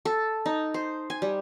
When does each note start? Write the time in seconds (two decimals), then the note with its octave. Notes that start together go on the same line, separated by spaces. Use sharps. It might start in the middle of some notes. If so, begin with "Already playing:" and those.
0.05 A4
0.46 D#4
0.74 C5
1.10 G#5
1.22 G3